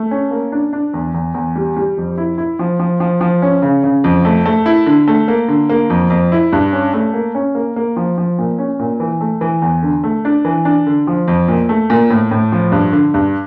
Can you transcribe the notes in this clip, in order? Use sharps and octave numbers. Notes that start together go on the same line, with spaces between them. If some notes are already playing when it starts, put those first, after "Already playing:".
Already playing: A3
C#4
A#3
D4
D4
E2
E2
E2
G3
G3
F2
E4
E4
F3
F3
F3
F3
C#4
C#3
C#3
F2
A3
A3
E4
D3
A3
A#3
D3
A#3
F2
F2
E4
G2
C#4
A3
A#3
C#4
A#3
A#3
F3
F3
A#2
C#4
A#2
E3
A3
E3
E2
D3
A3
D4
E3
D4
D3
F3
F2
A#2
A3
A#2
A2
A2
F3
G2
D3
G2